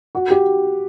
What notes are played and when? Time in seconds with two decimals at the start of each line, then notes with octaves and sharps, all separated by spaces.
0.15 F#4
0.30 G4